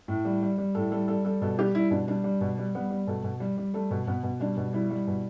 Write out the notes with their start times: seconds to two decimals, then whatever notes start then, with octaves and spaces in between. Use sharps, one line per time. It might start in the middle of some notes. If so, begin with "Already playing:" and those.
0.08 A2
0.25 G3
0.42 G3
0.58 G3
0.75 A2 A4
0.92 G3 A4
1.08 G3 A4
1.25 G3 A4
1.42 B2 A4
1.58 G3 G4
1.75 G3 E4
1.91 B2 D4
2.08 G3 D4
2.24 G3
2.41 B2
2.58 G3
2.75 G3 B3
2.90 G3
3.07 B2 A3
3.24 B2
3.40 G3
3.57 G3
3.74 G3 A3
3.91 B2
4.07 B2 B3
4.23 B2
4.40 G3 D4
4.57 B2
4.73 G3 E4
4.90 G3
5.07 B2